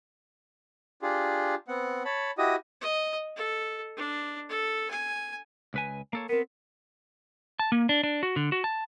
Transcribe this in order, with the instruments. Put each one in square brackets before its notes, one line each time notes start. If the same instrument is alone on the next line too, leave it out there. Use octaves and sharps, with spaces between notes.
[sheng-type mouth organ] D4 F4 G4 G#4
B3 C4 F#5
C#5 A5 B5
E4 F#4 G4 D#5 D#6
[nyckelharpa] D#5
A4
D4
A4
G#5
[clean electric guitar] C#2 B4 G#5
A#3 A4 C#5
[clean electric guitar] B3 C4 [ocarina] A#4
[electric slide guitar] A5
A#3
D4
D4
F#4
D3
F#4
A5